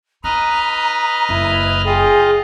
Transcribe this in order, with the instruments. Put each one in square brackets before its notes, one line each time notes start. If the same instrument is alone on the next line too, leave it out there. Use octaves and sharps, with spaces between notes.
[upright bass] D#4 [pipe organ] B4 D#5 F6 [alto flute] A#5
[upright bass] F#1 [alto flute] E4
[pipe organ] F4 D#5 [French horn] G#4 [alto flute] G5